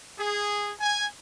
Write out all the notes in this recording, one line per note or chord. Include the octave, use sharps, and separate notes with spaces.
G#4
G#5